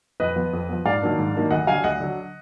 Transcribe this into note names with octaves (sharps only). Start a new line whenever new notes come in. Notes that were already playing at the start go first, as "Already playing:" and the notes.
F2 B4 D#5
F3 B3
F2
F3 B3
G#2 D5 F5
D#3 F#3 A#3 D4
G#2
D#3 F#3 A#3 D4
D2 D#5 F#5
D3 F#3 F5 G#5
D2 D#5 F#5
D3 F#3